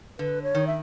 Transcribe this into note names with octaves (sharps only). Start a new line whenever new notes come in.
D3 B4
C#5
D#3
E5